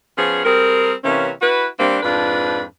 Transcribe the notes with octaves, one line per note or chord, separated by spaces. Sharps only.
F3 B3 C#4 G#4
G3 C4 G#4 A#4
C3 E3 A#3 C#4
E4 F#4 B4
G3 A#3 C4 D4
F2 G#2 D4 F4 B4